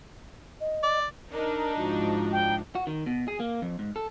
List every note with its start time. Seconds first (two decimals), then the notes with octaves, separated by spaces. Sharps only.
0.60 D#5
0.83 D5
1.32 D4 D#4 A#4
1.77 G#2 F3 F#4
2.32 G5
2.75 F#4
2.87 D#3
3.06 B2
3.28 G#4
3.40 A#3
3.62 F2
3.79 G#2
3.96 A4